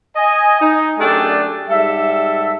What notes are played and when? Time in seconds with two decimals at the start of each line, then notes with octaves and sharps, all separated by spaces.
0.16 D#5 G#5
0.61 D#4
0.99 F#2 A3 D4 G4 G#4 D5
1.70 G#2 G3 A4 E5